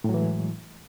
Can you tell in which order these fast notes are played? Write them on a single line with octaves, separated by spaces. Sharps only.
A2 F#3 E3 G#3